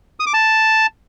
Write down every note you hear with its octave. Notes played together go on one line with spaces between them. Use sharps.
D#6
D6
A5